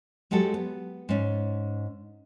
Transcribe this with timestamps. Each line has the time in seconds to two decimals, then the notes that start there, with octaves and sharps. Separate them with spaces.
0.31 F#3 G#3 F#4 G4 A4
0.54 B3
1.09 G#2 C#4